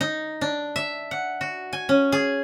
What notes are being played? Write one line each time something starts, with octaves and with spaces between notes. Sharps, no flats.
D#4
D4
E5
F#5
F#4
G#5
C#4
G#4